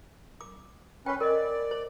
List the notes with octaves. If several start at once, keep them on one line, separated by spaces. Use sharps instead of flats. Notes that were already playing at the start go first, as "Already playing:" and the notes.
D6
C#4 B4 C#5 G5
A#4 D5 D#5
C5